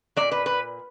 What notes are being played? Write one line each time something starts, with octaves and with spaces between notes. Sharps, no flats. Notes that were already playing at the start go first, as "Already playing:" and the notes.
A#2 F#3 D5
B4
B4